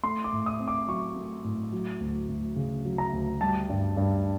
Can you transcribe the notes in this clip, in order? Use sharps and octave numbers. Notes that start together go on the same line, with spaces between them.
A3 C6
D6
A2
D#6
C4
D6
F#3 C#6
A3
A2
F#3
D2
D2
C#3
F#3
A#5
D2
G3 A5
G2
G2